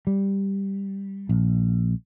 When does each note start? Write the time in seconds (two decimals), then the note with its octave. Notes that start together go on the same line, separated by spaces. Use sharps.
0.07 G3
1.29 A#1